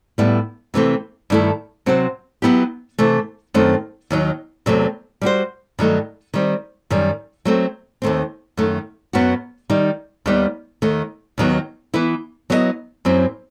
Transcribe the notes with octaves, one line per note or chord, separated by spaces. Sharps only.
A2 G3 B3 E4
C3 E3 A3 C4
G2 D#3 A3 E4 A4
C3 F#3 C4 F#4 C5
F#3 B3 E4 G4
C3 E3 A3
F#2 D#3 A3 C4
D#2 D#3 F#3
E2 C3 F#3 A3 C4
G3 C4 F#4 C5
G2 D#3 F#3 A3 D#4
D#3 G3 C4
F#2 D#3 G3
F#3 A3 C4
D#2 D#3 A3 C4
F#2 D#3 A3
F#2 F#3 B3 F#4
D#3 G3 D#4
D#2 D#3 G3 B3
D#2 D#3 A3
D#2 D#3 F#3 B3
E3 B3 E4 B4
F#3 B3 E4 A4 D#5
F#2 F#3 C4 E4